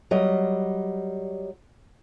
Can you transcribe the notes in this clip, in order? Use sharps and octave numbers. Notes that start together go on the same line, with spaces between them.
F#3 G3 D#5